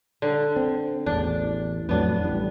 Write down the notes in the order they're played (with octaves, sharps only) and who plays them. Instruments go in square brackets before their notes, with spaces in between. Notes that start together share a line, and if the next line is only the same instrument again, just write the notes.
[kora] D3
[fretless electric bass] C4
[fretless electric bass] A1 E2 [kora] D4
[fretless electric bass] F2 A2 F#3 [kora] B3 D4
[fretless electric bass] A1 G3